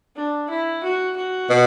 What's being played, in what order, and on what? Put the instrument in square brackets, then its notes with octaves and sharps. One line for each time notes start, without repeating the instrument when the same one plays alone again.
[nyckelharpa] D4
E4
F#4
F#4
[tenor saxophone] B2